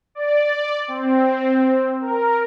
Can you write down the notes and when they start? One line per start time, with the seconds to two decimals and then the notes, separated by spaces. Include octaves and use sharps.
0.15 D5
0.88 C4
2.00 A#4